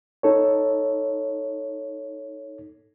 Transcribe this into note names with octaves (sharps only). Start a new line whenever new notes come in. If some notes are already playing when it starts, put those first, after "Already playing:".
D#4 A4 C#5